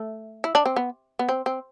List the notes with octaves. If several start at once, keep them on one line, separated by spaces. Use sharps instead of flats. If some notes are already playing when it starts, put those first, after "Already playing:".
Already playing: A3
E4
D4
C4
B3
B3
C4
C4